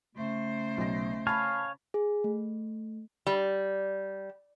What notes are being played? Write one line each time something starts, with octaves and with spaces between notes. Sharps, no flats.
C#3 A3 C5
B1 A#6
C#5 F5 G#5 A5 B5
G#4
A3
G3